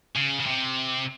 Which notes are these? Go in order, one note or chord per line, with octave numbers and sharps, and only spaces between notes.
C#3
C#3
C3